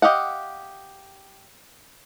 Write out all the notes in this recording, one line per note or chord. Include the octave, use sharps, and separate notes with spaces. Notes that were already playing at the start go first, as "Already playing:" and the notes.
G4 D#5 F5 F#5